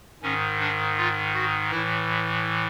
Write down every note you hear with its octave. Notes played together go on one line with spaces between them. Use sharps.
G#2 D#3 C#4
D4
F4
F#4
A2 E3 E4